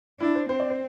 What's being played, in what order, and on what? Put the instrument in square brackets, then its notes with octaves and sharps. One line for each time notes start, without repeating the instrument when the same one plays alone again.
[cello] D4 [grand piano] E4
[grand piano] C5
[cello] C4 [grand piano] C5
[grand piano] D5
C5